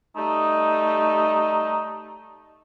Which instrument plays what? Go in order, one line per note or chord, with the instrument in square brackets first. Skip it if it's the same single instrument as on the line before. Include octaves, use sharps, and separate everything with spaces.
[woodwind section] G3 A3 D#4